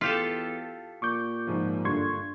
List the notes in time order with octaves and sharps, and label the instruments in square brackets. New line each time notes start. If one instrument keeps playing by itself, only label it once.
[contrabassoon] E2 [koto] F4 G4 A4 [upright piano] B6 F7
[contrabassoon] A#2 [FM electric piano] C#6 D6 G6
[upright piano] G#2 F3
[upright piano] G2 D3 [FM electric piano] C6 C#6 G#6